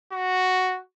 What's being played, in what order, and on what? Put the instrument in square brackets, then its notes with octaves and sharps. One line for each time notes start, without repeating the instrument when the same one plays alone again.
[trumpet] F#4